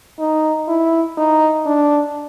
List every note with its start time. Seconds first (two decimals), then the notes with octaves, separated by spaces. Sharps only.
0.19 D#4
0.68 E4
1.18 D#4
1.66 D4